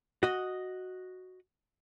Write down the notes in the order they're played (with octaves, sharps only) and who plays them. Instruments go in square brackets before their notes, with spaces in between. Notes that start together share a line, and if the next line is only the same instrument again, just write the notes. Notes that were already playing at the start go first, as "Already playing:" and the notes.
[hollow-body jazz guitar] F#4 D#5